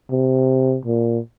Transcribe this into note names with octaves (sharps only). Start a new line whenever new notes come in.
C3
A#2